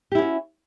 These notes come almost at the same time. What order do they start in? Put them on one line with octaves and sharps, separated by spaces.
G4 E4 C#4 F#4